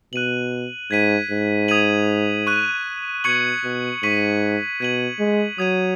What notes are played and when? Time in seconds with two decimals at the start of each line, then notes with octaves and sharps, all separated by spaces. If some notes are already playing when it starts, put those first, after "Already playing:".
0.13 B2 F#6 D#7 F#7
0.91 G#2 G#6 B6 D#7
1.30 G#2
1.68 D#6 G#6 D#7 F#7
2.47 C#6 F#6 D#7
3.24 B2 C#6 G#6 C#7 F#7
3.64 B2
4.03 G#2 C#6 B6 D#7 F#7
4.80 B2 G#6 D#7 F#7
5.19 G#3
5.58 F#3 D#6 G#6 D#7